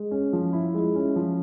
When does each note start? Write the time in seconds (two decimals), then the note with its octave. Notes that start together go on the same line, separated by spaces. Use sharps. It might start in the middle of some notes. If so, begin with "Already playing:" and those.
Already playing: G#3
0.11 C#4
0.33 F3
0.53 E4
0.74 G#3
0.95 C#4
1.16 F3